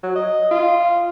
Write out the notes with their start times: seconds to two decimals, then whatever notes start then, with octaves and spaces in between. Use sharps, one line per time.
0.03 F#3
0.16 D#5
0.51 F4